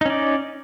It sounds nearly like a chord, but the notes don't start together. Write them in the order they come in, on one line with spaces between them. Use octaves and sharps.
D#4 C#4 D5